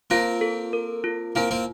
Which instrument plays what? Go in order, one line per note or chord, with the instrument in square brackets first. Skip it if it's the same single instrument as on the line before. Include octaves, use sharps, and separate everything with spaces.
[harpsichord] A#3 C4 [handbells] F4
[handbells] A4
A#4
F4
[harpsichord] A#3 C4 [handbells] E4
[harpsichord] A#3 C4